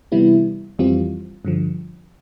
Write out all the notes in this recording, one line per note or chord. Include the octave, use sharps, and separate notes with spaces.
C3 E3 G3 B3 E4
F2 E3 G3 C4 F4
G2 D3 F3